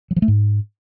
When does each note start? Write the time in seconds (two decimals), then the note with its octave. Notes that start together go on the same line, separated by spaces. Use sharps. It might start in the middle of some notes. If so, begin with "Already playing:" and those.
0.11 F#3
0.16 F3
0.22 A3
0.28 G#2